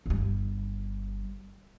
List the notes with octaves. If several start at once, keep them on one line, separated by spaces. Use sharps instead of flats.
G1 G3